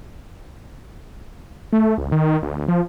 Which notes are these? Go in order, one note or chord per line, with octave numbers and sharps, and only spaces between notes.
A3
C#2
D#3
D2
F3